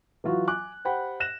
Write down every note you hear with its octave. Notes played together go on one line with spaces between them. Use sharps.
E3 F#3 F4 F#4
G#5 D6 F#6
G4 C5 F#5 G5 B5
F#6 A#6 E7